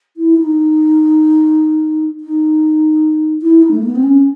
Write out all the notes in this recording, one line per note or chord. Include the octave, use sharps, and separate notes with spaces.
E4
D#4
D#4
E4
D#4
A3
A#3
B3
C4
C#4